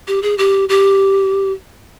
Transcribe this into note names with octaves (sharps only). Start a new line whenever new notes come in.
G4
G#4
G4
G4